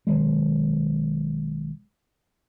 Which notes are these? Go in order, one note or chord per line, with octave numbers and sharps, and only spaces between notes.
B1 D#3 F#3 G#3